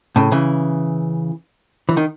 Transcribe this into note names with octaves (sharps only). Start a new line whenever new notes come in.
A2 C#3
C#3 E3
E3
D#3